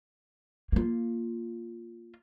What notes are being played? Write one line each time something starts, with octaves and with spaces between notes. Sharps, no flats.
A#3 F4